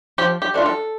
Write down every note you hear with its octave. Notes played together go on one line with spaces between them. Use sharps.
F3 G4
G4
A3 D4 F4
A4